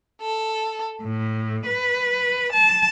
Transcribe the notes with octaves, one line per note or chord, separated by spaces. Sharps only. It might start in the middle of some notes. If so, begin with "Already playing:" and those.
A4
A2
B4
A5